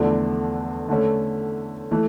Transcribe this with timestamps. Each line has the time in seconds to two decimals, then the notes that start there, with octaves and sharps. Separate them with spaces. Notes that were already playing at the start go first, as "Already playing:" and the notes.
Already playing: E2 D3 F3 A3 D4
0.89 D3 A3 C#4
1.91 E3 A3